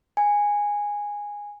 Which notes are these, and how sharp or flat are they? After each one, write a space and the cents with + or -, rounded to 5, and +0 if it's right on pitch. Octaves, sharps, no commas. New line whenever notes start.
G#5 -10